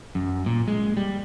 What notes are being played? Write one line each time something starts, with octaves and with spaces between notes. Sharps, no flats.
F#2
A#2
G#3
G3